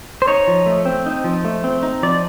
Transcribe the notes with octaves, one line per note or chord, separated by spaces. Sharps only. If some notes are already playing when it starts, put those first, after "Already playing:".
C5
D#4 C#5
F3
A3
C4
D#4
F3
A3
C4
D#4
F3 D5